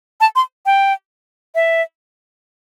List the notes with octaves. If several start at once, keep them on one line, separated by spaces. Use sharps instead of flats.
A5
C6
G5
E5